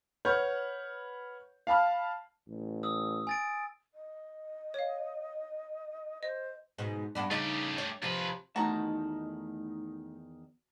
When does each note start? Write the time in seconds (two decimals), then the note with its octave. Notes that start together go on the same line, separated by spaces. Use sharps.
0.25 B4 C#5 F#5 C#6 F6 G6
1.67 F5 A5 B5 F6
2.48 A1
2.83 D#6 E6
3.27 G#5 A6 D7
3.94 D#5
4.74 C#5 F5
6.23 C5 D#5
6.78 G#2 B2
7.15 G2 B3 D4
7.31 C#3 A3 C#4 D#4 G4
7.78 C#5
8.02 D#2 C3 F3 B4
8.56 E2 D#3 A3 D#4 F#4 A5 A#5